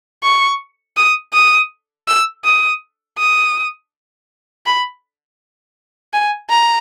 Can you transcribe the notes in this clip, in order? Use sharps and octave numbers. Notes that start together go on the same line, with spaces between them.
C#6
D#6
D#6
E6
D#6
D#6
B5
G#5
A#5